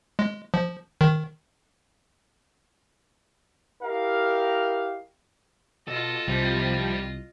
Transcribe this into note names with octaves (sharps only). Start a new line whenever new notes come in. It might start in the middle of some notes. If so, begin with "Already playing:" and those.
G#3
F3
D#3
E4 G4 A#4 D#5 F5
B2 F4 A4 D#5
C2 C3 F3 G3 G5